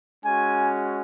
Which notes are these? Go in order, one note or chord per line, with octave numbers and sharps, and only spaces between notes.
G#3 C#4 F#4 G#5